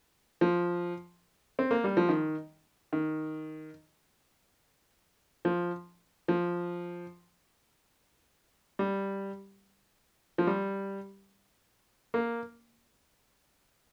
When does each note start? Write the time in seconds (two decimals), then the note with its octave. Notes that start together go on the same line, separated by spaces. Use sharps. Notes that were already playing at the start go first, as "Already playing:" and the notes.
0.41 F3
1.59 C4
1.71 A#3
1.84 G3
1.97 F3
2.09 D#3
2.93 D#3
5.45 F3
6.28 F3
8.79 G3
10.38 F3
10.47 G3
12.14 A#3